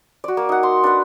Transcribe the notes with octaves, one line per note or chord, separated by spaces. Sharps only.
F#4 D5
A#3
D#4 F#5
C6
D4 B4 F#5